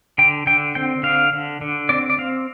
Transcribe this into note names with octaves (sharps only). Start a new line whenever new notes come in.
D3 G5
D3 G5
C4 G5
D3 F5
D3
D3
C4 D5
D5
C4 F5